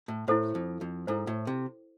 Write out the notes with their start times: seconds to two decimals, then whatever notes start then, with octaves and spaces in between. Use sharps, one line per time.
0.08 A2
0.28 A2 E4 A4 C5
0.55 F2
0.81 F2
1.07 G#2 E4 A4 C5
1.27 A2
1.47 C3